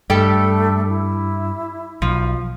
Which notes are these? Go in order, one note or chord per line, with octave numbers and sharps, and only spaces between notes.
G2 G3 A3 A4 G5
E4
B1 F3